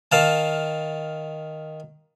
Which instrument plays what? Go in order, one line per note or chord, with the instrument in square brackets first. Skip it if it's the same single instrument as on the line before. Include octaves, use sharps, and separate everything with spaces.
[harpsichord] D#3 F5 A5